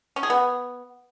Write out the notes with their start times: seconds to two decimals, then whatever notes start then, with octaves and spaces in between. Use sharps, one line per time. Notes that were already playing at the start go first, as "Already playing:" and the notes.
0.16 C#4
0.23 G#4
0.30 B3